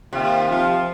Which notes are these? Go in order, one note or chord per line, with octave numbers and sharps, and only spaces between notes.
C3 D#3 A#3 F4
F3 C4 F4